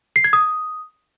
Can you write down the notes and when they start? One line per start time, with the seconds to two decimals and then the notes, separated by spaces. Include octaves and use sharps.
0.16 C7
0.24 G#6
0.33 D#6